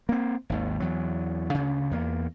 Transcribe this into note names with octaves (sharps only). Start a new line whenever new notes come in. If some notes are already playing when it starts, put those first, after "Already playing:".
A#3 C4
G#1 D#2
E2 F#3
D2 C#3
E2 A#3